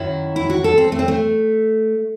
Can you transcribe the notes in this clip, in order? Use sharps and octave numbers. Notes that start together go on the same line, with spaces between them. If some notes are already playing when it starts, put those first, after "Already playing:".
Already playing: F#2 D#3 F#3 E4
E4
F#4
A4
C4
A3
C4
A3